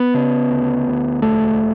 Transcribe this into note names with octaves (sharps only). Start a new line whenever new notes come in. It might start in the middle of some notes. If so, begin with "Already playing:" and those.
Already playing: B3
C#3
D2
D2
E1 A3